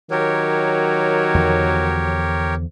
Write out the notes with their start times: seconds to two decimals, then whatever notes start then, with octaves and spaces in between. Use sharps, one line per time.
0.11 D#3 F#3 G4 A#4 C#5
1.34 E2 D3 F3